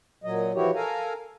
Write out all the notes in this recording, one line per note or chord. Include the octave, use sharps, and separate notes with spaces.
A#2 F#3 D#5
E3 F3 E4 F#4 G4 C#5
A4 A#4 F5 G#5 A#5